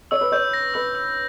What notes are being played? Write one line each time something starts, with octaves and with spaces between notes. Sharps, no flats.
C#5 E6
B4
C#5 G6
A#6
B4 E6
E6